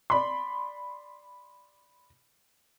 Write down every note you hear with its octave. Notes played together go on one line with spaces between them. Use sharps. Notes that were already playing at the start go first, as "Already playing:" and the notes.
D5 B5 C6